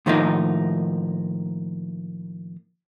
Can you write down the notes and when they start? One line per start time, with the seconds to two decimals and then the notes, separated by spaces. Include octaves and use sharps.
0.06 A2 D#3 F3 A#3 D#4